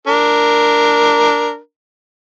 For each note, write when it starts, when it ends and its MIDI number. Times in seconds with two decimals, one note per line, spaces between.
0.07 1.58 62
0.07 1.58 70